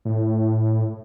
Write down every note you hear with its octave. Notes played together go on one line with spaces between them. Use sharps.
A2